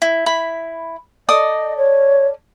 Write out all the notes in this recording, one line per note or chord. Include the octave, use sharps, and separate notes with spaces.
E4
E4 B5
A4 D5 D#5 D#6
C#5